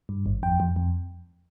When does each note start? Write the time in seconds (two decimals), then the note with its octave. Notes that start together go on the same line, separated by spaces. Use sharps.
0.09 G2
0.26 G#1
0.43 F2 G5
0.60 F2
0.76 F2